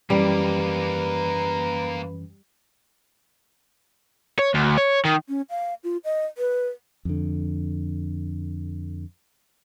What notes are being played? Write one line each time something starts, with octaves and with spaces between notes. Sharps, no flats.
F#2 E3 G3 A#3 C#4 G4 B4
C#5
D2
C#5
D#3
C#4
F5
F4
D#5
B4
F2 D3